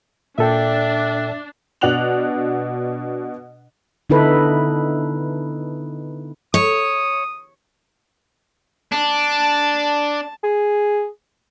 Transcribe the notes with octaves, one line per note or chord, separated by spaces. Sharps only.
A#2 D4 A4 E5 G5
B2 D4 F#5 F#6 F7 F#7
D3 B3 D#4 E4 A4 B4
C#5 D#6
D4 A5
G#4